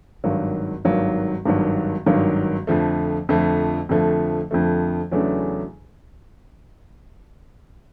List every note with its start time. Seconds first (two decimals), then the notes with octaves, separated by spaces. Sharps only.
0.24 G#1 G2 D#3 F#3
0.85 G#1 G2 D#3 F#3
1.46 G#1 G2 D#3 F#3
2.06 G#1 G2 D#3 F#3
2.67 F2 D3 F3 A3
3.29 F2 D3 F3 A3
3.89 F2 D3 F3 A3
4.51 F2 D3 F3 A3
5.11 E2 C#3 F#3 A3 D4